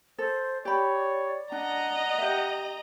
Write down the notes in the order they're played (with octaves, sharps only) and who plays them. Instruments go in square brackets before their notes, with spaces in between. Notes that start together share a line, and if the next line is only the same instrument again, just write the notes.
[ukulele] A4 [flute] C5
[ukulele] G4 B5 [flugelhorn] C#5 [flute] D5
[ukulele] D4 [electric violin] D#5 A#5 [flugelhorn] F#5
[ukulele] G4 E5